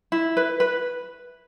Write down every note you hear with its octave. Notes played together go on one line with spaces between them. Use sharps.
E4
B4
B4